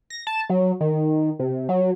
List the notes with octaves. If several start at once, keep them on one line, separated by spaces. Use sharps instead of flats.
A#6
A5
F#3
D#3
C3
F#3